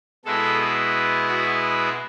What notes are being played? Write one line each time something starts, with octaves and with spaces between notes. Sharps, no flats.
B2 G#3 B3 E4 A4
F#4